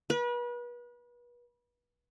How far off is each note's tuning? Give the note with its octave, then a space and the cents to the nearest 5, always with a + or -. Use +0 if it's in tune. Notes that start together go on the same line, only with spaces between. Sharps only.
B4 -35